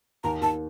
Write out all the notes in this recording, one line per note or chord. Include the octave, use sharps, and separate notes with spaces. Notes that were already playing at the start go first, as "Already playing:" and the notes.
D#2 A#5
D#2 A5